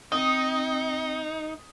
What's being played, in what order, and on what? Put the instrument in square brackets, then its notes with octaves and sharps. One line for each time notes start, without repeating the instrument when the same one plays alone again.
[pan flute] C4 [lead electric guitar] D#4 [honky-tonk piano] D#6